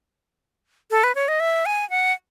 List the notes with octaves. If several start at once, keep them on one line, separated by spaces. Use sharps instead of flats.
A4
B4
C#5
D#5
E5
G#5
F#5